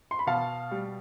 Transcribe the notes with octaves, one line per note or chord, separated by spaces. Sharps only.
C6
B5
B2 F5 A5
G3